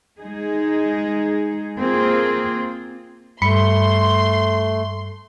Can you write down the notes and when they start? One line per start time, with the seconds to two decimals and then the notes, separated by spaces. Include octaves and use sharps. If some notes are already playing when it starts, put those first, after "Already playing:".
0.18 G#3 D#4 G#4
1.77 A#3 C4 F4 G#4
3.42 G2 A3 B5 C6 C#7